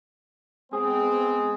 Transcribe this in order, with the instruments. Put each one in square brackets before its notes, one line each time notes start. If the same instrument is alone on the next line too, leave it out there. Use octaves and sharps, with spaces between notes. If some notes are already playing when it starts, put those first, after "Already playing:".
[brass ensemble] G#3 B3 C4 [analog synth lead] G#4